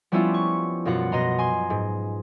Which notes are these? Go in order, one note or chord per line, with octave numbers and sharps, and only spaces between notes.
F3 G3 B3 C#4 E4 F4
C#6
F#2 B2 F4 F#5
B2 D#5 A#5 C6
G#5 C6
G#2